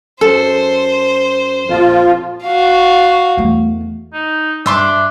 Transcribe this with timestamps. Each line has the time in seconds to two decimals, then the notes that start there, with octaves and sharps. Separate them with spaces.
0.21 F#2 A4 C5
1.69 A#1 F2 F3 F4
2.45 F#4 F5
3.37 E2 A3
4.14 D#4
4.66 G2 D4 E5 C6 D6